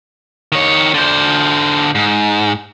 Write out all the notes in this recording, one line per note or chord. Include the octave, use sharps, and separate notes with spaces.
D#3 C#5
D3 C5
G#2